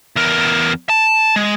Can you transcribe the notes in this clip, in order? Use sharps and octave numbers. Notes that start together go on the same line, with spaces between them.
E2 A#4
A5
G#3